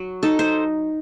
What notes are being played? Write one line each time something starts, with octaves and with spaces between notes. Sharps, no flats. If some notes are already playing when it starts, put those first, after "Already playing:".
Already playing: F#3
D#4 A4
C5